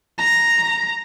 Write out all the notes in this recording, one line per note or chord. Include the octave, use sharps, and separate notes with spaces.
A#5